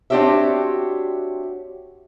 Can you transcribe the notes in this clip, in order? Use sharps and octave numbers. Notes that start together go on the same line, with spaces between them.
C4 D4 F#4 G4 C#5 E5